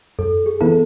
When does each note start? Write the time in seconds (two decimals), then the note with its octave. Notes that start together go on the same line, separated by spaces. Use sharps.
0.19 F#2 A4
0.46 G#4
0.61 E3 B3 E4 A4